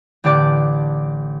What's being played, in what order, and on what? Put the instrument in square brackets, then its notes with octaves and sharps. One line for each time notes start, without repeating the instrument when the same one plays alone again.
[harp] A1 D3 G4 D5 D6 F#6